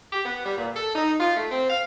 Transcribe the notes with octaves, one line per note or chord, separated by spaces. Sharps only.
G4
B3
G3
A#2
A4
D#4
F4
A3
C4
F5